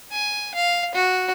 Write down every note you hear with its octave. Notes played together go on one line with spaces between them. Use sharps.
G#5
F5
F#4